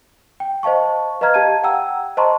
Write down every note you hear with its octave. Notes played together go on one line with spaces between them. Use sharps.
G5
C5 D#5 F5 A5 C#6
B4 D#5 F5 A#5 F6 G#6
G4 D#5 F5 A5 G#6 D#7
F#5 G5 A#5 E6
C5 D#5 A5 A#5 C6 C#6